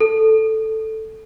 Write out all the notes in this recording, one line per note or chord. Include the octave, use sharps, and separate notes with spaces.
A4